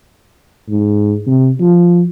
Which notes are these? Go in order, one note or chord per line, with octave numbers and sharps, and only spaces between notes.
G#2
C3
F3